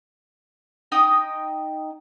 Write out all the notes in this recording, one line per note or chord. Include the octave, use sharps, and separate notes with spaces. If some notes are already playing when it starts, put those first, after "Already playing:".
D#4 D#5 G5 D#6